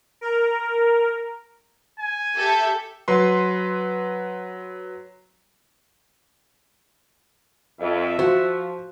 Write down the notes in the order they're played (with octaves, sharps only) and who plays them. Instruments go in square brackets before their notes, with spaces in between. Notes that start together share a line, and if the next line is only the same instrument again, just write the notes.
[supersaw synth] A#4
[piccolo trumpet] G#5
[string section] G4 A4 E5
[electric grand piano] F#3 B4 C6
[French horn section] F2 [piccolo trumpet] E5
[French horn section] F3 [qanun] F#4 [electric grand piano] C5